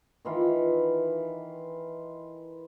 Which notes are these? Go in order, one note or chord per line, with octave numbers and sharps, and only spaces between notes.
D#3 E3 F4 B4